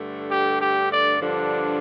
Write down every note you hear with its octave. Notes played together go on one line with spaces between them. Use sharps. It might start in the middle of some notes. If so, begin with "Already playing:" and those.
Already playing: G2 D3 A3
G4
G4
D5
G2 D3 F3 D4